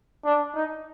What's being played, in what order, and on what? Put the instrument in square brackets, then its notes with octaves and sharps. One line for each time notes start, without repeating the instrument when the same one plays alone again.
[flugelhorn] D4
D#4